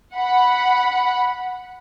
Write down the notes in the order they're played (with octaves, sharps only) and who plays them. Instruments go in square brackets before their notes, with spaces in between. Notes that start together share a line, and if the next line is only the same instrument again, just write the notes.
[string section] F#5 B5